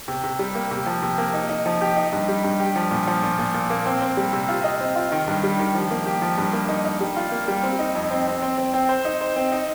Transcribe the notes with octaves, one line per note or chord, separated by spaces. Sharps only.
C3
C3
G3
A#3
C3
F3
C3
A#3
D#4
D#4
F3
G4
D#4
G2
G3
G2
G4
F3
A#2
F3
A#2
A#2
A#2
A#3
C4
C4
G3
C3
F4
D#5
C4
F4
D#3
G2
G3
D#3
F3
A#3
G4
F3
G2
A#3
D#4
D#4
G3
F4
A#3
G3
C4
D#4
F2
C4
C4
C4
C4
C4
C5
D#4
C5
C4
D#4